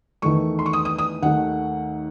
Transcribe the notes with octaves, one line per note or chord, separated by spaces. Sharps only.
E2 D#3 A3 C#6
C6
C#6
D#6
D#6
D#6
D#2 D#3 A3 F#5